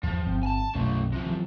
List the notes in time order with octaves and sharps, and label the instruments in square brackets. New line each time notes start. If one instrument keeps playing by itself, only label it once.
[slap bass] E2 G2 [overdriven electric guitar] F3
[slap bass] G1 G2 C4
[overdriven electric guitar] G#5 A5
[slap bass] B1 F#2 [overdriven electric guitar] A3 C#4
[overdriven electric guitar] C3 F3
[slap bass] E3 F#3